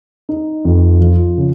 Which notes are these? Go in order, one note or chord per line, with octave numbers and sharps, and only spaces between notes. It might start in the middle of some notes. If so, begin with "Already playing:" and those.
D#4
F2
F3
C#3